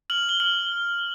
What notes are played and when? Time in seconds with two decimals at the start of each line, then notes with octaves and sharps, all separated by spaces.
0.10 F6 F#7
0.29 G7
0.40 F6 F#7